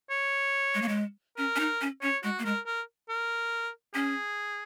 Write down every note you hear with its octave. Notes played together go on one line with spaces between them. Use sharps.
C#5
G#3
A#3
G#3
C#4 A#4
C#4
D#4
C#4
C#4 C#5
G#3 F#4
A#3
G#3 A#4
A#4
A#4
C#4 G#4